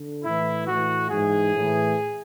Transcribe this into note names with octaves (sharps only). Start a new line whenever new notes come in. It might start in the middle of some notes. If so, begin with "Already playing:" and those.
Already playing: D3
A2 E3 E4
A2 E3 F#4
G#2 E3 G#4
A2 E3